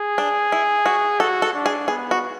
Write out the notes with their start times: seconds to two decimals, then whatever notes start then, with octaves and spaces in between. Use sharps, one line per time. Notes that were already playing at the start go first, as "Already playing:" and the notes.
Already playing: G#4
0.18 D4
0.52 E4
0.86 F#4
1.20 F#4 A4
1.42 A4
1.54 D4
1.66 G#4
1.88 B3 G#4
2.11 F#4